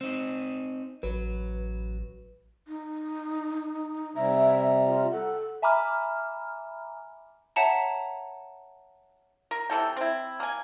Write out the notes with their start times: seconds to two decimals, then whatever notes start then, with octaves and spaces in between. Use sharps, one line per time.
0.01 C4 D#4
1.03 A1 F#3 B4
2.68 D#4
4.15 C3 G3 E5 A#5
4.87 F4
5.12 A4 F#5
5.62 E5 G#5 A#5 B5 D6 F6
7.56 C#5 E5 F#5 A5 A#5
9.51 A#4
9.70 C3 E3 A4 G5
9.97 C4 E4
10.40 A#3 G#5